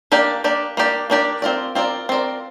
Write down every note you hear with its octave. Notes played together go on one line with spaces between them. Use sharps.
A#3 D4 G4 D5
A#3 D4 G4 D5
A#3 D4 G4 D5
A#3 D4 G4 D5
C4 F4 A#4 D5
C4 F4 A#4 D5
C4 F4 A#4 D5